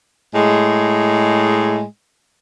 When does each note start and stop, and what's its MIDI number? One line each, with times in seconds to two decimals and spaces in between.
0.34 1.83 45
0.34 1.83 56